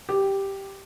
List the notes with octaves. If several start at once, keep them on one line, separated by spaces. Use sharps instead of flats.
G4